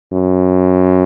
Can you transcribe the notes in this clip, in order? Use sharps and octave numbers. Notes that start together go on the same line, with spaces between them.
F#2